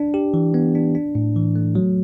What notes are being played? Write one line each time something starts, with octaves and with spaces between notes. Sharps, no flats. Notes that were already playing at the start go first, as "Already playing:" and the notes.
Already playing: D4
G4
E3
B3
D4
D4
A2
E3
A3
F#3